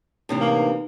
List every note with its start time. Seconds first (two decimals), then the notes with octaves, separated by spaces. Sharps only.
0.29 A2 C3 E3 D4 D#4 B4
0.41 A#3